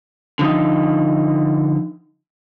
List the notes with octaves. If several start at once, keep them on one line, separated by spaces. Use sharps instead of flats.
D3 F3 D#4